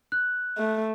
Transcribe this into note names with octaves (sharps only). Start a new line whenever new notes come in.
F#6
A3